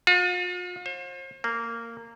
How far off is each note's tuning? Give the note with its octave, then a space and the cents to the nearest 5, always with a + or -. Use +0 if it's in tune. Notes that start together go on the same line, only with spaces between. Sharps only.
F4 +40
C5 +40
A#3 -15